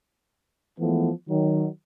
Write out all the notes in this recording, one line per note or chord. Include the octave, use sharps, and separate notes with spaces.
E3 F3 G#3 A3 B3
D#3 F#3